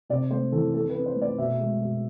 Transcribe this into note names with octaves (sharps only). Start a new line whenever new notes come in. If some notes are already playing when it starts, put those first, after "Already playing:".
C3 D5
A3 C5
E3 A4
C4 A4
B4
C4
C5
A3
D5
B2 E5
G#3
B2